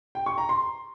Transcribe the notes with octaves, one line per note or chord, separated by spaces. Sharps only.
G5
C#6
A#5
C6